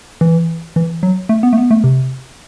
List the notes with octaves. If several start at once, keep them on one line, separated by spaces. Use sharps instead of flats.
E3
E3
F#3
A3
B3
A3
B3
A3
C3